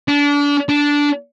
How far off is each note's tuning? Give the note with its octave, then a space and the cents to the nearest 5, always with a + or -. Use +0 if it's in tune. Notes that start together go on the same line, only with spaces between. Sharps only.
D4 -30
D4 -10